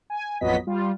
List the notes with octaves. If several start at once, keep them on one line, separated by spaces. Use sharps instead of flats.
G#5
A1 F2 F#3 B3 D#5 B6
G3 F4